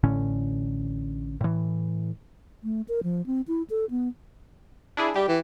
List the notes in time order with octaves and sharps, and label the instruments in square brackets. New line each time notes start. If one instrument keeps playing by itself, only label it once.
[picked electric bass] A1 A2 D3 C#4
A2 E3
[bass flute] A3
A#4
F3
C4
E4
A4
B3
[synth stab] D4 E4 G#4
[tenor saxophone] G3 [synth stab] G4
[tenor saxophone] E3